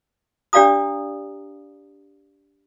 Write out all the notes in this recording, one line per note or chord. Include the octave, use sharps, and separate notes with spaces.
D4 G4 D5 F5 A#5 D#6